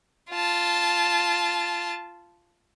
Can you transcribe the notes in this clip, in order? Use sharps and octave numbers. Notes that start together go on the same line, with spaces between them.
F4 A5